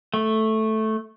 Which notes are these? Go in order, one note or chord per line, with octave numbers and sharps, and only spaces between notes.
A3